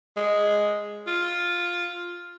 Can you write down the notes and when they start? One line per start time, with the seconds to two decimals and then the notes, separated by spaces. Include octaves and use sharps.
0.17 G#3
1.07 F4